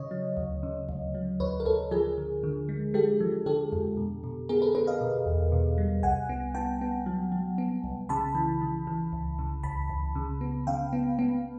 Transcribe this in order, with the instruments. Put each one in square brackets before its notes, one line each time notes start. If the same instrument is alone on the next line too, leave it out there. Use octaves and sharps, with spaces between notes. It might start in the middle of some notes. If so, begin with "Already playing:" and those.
Already playing: [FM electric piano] C#3 C#5 D#5
F#3
D2
C#3
D2
F#3
D2 B4 C#5
A#4
D2 A4 B4
F3 G#4 A#4
D3
D3
G#3
G#3 G4 A4
F3
D3 G4 A4
F2
B2
B2
B3 G#4 A#4
A4 B4
B3 A4 B4
D#5 F5
B2
E2
B2
G3
C2 F#5 G#5
B3
B3 G5 A5
B3
F#3
F#3
B3
C2
C#3 A5 B5
E3
E3
E3
C#2
C#3
C#2 A5 B5
C#2
C#3
B3
C#3 F5 G5
B3
B3